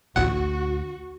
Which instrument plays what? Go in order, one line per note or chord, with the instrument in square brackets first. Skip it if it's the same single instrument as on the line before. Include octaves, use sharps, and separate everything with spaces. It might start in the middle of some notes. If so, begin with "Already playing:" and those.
[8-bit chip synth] A1 F#5 [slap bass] D2 [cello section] F#4